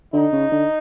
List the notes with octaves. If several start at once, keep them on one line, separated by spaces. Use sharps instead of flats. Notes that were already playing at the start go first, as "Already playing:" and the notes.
D3 D#4
C#3
D3